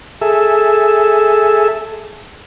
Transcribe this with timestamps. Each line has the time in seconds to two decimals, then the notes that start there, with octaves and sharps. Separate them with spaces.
0.22 G#4 A4 E5